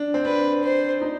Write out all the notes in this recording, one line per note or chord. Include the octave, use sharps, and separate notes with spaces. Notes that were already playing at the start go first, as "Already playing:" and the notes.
Already playing: D4
C4
D4 B4
C5
D#4